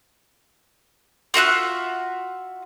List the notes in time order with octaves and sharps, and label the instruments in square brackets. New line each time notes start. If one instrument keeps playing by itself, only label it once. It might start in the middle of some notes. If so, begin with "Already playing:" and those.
[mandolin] F4 F#4 E5 F#6